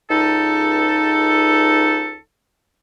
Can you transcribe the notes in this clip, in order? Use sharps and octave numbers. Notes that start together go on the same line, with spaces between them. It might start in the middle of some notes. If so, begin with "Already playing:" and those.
C#2 D#4 A4